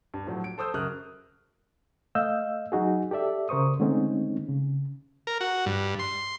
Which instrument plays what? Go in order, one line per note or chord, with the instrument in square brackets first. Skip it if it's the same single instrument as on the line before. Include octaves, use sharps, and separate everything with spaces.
[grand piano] G2
A2 F3 F#3
D7
A4 C5 D#6 E6 G6
F#2 C#3 A#4 D#6 F6 F#6
[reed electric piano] A3 D#5 F5 E6 G6
F#3 D#4 F#4 G#4
G4 A4 D5 E5
C#3 A#4 C5 C#6 D#6
D3 G#3 A3 C4 C#4 D#4
C#3
[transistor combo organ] A#4
F#4
G2
C6